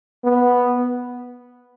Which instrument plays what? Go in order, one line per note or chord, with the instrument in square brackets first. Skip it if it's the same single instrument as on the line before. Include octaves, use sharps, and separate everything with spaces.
[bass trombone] B3